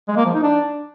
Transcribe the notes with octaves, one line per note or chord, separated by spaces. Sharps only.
G#3
A#3
F3
D#4
D4